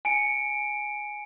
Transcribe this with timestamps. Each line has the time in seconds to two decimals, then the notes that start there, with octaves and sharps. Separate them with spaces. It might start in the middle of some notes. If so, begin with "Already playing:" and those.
0.05 G#5 C#7 D7